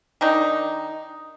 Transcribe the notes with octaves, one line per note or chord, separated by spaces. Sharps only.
D#3 D4 D#4